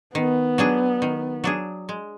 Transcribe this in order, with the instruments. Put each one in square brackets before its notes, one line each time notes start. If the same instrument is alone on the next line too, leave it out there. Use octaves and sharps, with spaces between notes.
[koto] D#3 [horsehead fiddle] B3
[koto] F#3 D4 G#4
D#3
F#3 D4 G#4
G#3